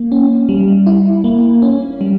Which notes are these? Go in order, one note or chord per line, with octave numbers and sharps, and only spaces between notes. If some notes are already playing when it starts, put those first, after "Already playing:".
Already playing: A#3
C#4
G3
E4
A#3
C#4
G3